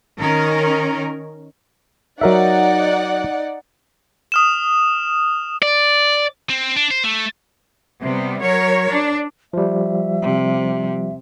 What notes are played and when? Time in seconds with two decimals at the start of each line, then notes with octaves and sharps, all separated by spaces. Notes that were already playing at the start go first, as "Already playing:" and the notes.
0.20 D#3 C#4 A#4
2.21 F#3 D#4 A#4 D5 E5 F#5
4.32 D#6 F6 E7
5.62 D5
6.50 C4
6.76 D4
6.91 C5
7.04 A3
8.00 C3 G3 B3
8.41 F#3 A#4 C#5
8.91 D4
9.53 F3 G3 E5
10.23 C3